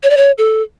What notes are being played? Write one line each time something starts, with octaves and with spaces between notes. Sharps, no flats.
C#5
D5
C#5
A4